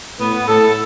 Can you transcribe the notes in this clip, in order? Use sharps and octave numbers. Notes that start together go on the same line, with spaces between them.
A2 B3
A2 A4